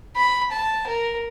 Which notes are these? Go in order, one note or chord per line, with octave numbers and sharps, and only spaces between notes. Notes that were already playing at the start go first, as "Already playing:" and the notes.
B5
A5
A#4